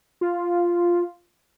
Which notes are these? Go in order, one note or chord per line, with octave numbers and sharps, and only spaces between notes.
F4